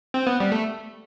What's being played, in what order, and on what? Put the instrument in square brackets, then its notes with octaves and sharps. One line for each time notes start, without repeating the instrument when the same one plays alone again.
[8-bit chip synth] C4
B3
G3
A3